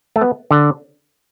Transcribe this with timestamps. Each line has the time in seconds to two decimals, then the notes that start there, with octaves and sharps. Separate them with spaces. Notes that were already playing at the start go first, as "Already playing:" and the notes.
0.16 A3
0.21 B3
0.51 D3